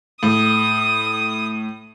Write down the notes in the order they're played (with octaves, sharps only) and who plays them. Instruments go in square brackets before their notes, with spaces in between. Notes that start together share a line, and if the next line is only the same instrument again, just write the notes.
[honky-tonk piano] A2 [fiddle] D#6